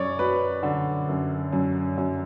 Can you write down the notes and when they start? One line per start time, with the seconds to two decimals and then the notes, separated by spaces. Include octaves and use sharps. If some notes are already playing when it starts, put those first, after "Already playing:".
Already playing: F#2 F#3 C#5 D5
0.19 F#3 B4
0.63 D3
1.09 F#2
1.53 F#2
1.98 F#2